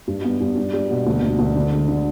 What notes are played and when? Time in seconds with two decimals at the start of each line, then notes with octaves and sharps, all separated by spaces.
0.08 G2
0.24 B3
0.41 G2
0.57 D4
0.74 G3
0.91 B2
1.06 D2
1.22 D2
1.39 D2
1.56 D3
1.72 G#3
1.88 D3